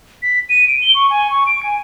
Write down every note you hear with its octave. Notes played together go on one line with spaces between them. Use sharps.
B6
D#7
D7
G7
C#6
G#5
C#6
D7
G#5